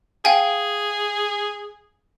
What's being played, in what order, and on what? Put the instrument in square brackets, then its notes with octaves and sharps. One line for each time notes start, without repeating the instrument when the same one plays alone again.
[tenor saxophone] G#4 [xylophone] F5 G5 G#5